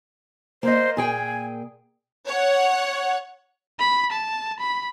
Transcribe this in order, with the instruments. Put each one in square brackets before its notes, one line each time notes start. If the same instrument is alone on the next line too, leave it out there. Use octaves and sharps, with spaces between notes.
[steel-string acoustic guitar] A#3 D#5 [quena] C5
[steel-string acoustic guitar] A#2 G#4 G5 [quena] G#5
[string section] C#5 F#5
[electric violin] B5
A5
B5